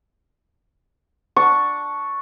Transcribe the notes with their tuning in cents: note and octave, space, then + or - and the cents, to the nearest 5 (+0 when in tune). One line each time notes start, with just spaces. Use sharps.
D4 +0 C#6 +0